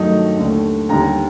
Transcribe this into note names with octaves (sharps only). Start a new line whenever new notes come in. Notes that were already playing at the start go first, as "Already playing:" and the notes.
Already playing: G2 D#3 F#3 A3 D#4
D#2 D3 A3
D#2 D3 G3 A#5